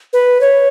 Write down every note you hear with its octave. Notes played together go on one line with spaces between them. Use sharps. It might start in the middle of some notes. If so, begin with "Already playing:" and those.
B4
C#5